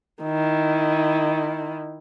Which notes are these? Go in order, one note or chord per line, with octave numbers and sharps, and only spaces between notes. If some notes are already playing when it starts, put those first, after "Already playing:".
D#3 E4